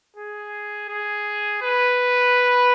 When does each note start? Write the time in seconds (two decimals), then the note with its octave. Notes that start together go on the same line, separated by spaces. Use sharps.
0.16 G#4
0.89 G#4
1.62 B4